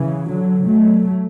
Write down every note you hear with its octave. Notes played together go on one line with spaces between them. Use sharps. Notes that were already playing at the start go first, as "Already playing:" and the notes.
Already playing: C#3 E3
D3 F#3
F#3 A3